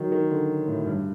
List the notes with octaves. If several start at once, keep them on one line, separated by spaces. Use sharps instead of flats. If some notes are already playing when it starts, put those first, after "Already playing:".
Already playing: D#3 F#3
D#3
D3
A2
G2